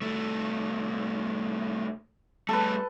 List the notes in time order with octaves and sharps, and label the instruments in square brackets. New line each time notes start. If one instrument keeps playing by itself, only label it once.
[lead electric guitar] C2 A3
[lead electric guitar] G3 A3 [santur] A4 B4